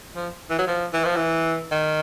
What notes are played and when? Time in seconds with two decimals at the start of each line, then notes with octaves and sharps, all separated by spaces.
0.15 F3
0.50 E3
0.58 F#3
0.67 F3
0.93 E3
1.05 F3
1.16 E3
1.71 D#3